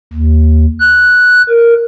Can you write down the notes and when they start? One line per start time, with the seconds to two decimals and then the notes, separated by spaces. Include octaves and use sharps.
0.13 D#2
0.80 F#6
1.49 A#4